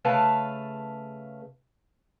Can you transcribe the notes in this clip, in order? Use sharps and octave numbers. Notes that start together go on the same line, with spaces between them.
C#3 A3 B4 F5 A5